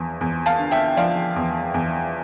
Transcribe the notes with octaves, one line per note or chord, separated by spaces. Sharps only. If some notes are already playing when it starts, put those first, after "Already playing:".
Already playing: E2 F3
E2
F5 A5
D3
E5 G5
F3 D5 F5
E2
E2